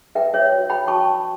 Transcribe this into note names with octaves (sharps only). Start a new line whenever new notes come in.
B4 E5 G5
C#5 E5
F#4
G5 B5
F#4 A5 C#6